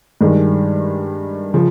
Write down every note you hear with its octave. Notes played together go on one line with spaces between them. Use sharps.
G2 D#3 G#3
C#3 F3